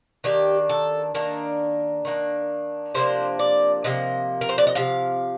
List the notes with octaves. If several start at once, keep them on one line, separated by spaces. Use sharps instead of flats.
D#3 A#3 D4 G4
A4
D#3 A#3 D4 A#4
D#3 A#3 D4
C3 F3 A#3 D4 C5
D5
C3 F3 A#3 D#5
A#4
C5
D5
D#5
C3 F3 F5